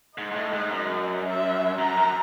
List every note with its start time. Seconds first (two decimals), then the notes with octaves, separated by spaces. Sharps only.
0.18 G#2 D#5
0.31 G#2
0.36 A2
0.53 G#2
0.72 F#2
1.26 E5
1.79 F#2 A#5
1.97 F#2